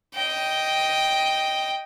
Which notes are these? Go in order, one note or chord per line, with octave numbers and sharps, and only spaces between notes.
D#5 G5